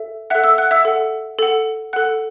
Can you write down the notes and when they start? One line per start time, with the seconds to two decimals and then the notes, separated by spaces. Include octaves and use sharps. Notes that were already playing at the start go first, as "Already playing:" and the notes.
Already playing: A4 E5
0.30 A4 E5 F#5 F#6
0.44 E5 E6
0.58 F#5 F#6
0.71 E5 E6
0.85 A4 F#5
1.39 A4 F#5
1.93 A4 F#5 F#6